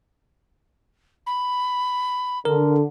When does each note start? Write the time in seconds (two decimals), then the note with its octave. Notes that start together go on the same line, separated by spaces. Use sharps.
1.26 B5
2.45 D3 A#4